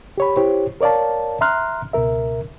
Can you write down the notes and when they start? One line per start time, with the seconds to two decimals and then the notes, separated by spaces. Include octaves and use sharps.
0.18 G4 C#5 B5
0.36 E4 G4 C5 C#5
0.81 A#4 C#5 D5 F5 A5
1.41 E5 A#5 C6 F6 F#6
1.93 C#2 B2 A#4 E5